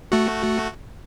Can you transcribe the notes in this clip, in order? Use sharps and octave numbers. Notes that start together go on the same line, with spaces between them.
A3 F#4